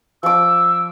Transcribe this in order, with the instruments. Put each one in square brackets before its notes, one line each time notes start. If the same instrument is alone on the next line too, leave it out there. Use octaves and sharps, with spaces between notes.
[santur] F3 D6 [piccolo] E6